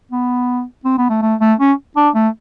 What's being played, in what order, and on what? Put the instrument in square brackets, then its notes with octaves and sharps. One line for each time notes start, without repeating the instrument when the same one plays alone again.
[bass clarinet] B3
C4
B3
A3
A3
A3
C#4
D4
A3